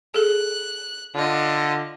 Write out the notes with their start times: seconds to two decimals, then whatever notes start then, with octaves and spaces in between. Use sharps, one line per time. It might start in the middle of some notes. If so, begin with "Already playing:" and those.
0.14 G#4 A4 F#6
1.14 D3 F4 D#5